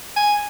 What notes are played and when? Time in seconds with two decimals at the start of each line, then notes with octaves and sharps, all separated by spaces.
0.16 G#5